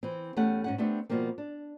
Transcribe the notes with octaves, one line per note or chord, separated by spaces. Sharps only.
E3 C4
E2 A3 C#4 G4 F#5
G#2 C#4 F#5
A3 B3 C4 D4 G4
B2 F3 G3 A#3 C4
D4